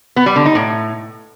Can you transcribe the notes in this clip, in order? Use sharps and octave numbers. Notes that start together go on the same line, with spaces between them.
B3
G3
D3
D#4
A2